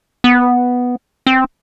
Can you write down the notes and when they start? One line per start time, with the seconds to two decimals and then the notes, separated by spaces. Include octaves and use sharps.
0.24 B3
1.27 C4